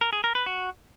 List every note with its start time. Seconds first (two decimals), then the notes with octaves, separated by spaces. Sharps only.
0.01 A#4
0.13 G#4
0.24 A#4
0.35 B4
0.46 F#4